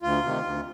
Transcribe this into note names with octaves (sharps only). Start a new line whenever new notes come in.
D2 F4
C3 D#3
D2